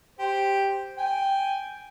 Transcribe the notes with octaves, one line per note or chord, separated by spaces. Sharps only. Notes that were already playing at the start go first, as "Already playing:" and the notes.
G4 C5
G5 G#5